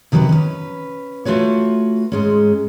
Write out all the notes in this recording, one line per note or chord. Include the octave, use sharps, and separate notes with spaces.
C3 D#3 F#3 A#4 B4
C#4 B4
A3 F4 F#4 B4 C#5
G#2 G#3 C#4